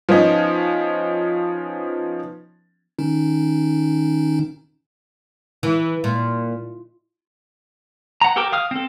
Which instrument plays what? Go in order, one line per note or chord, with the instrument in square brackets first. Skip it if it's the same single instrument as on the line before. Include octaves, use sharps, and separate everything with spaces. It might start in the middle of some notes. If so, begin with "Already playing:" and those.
[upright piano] F3 B3 C#4 D#4
[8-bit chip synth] D#3 C#4 D#4
[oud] E3
A#2
[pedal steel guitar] F#5 A#5
G4 A4 A#4 G5 D6
F5 D#6 F6
C4 A4